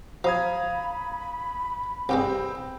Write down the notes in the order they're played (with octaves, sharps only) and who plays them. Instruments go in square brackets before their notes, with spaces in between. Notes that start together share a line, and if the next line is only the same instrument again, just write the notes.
[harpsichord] F3 [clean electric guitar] F5 [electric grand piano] A#5 D#6 G#6 [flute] B5
[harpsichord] C2 G2 G#3 [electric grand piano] C4 G5